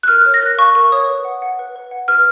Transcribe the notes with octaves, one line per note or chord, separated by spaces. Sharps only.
F#6
A#4 F6
F#6
C#5
A#6
A#4 F#6
F5 C#6
A#4 C#6
C#5 D#6
B4
F#5
F#5
B4
B4
F#5
B4 F6